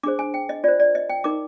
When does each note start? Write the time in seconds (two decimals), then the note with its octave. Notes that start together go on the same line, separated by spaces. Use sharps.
0.03 D4 G#4 C5 D6
0.19 G#5
0.34 G5
0.49 D#5
0.64 F4 C5 D5
0.80 D5
0.95 D#5
1.09 G5
1.24 D#4 A#4 D6